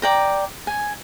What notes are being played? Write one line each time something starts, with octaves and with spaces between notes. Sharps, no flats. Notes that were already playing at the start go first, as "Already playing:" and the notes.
D5 G5 A#5
G#5